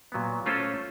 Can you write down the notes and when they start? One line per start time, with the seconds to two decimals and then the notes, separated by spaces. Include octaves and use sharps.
0.12 A#2 F#3 B3
0.46 A3 C#4 F4 A4 C5